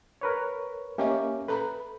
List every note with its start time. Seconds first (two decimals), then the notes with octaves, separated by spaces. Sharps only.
0.21 A#4 B4 C#5
0.98 A#3 C#4 G4 C#5 D#5 E5
1.48 A4 B4 A#5 B5